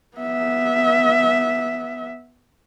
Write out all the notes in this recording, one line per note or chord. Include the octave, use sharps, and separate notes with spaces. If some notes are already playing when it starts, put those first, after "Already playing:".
B3 E5